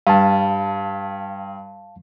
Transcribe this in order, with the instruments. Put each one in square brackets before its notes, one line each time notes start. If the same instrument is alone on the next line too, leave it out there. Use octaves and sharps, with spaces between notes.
[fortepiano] G2 [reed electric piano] F5 A5